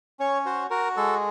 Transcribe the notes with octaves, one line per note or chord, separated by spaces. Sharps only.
C#4 C#5
F#4 C5
F#4 A#4
G#3 A4